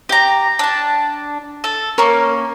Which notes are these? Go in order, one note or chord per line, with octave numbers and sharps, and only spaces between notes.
G4 G5 A#5
D4 A5
A4
A#3 C#4 A#4